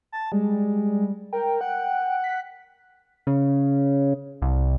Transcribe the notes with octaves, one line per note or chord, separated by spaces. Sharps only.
A5
G3 G#3
A#4 G5
F#5
B6
C#3
C2